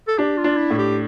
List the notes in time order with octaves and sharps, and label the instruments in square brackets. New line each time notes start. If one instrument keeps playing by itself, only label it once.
[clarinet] A4
[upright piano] D4 [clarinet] G4
[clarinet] F4
[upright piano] D4
[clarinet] E4
[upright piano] A2
[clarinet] G4